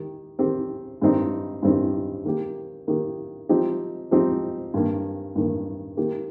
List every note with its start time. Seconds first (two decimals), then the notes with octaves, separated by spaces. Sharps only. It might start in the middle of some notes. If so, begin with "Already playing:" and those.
Already playing: D#3 G4
0.39 D#3 C4 G4
1.01 G2 D#3 G3 C4 D#4
1.62 G2 D#3 G3 C4 D#4
2.25 D#3 A#3 G4
2.87 D#3 A#3 G4
3.49 F3 C4 D#4 G4
4.11 F3 C4 D#4 G4
4.74 G2 D#3 A#3
5.35 G2 D#3 A#3
5.97 D#3 A#3 G4